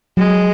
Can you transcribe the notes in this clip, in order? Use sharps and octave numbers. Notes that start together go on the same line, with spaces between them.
F#3 G#3